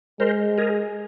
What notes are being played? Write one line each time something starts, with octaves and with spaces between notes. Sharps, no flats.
G#3 A#4 C5
G#4 A#4